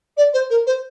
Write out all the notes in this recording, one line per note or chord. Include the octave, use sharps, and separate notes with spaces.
D5
C5
A#4
C5